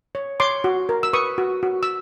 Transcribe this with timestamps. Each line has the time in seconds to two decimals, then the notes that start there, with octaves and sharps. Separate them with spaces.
0.15 C#5
0.40 C#5 C6 D6
0.64 F#4
0.89 A#4
1.03 E6
1.13 B4 C#6 D#6
1.38 F#4
1.63 F#4
1.83 E6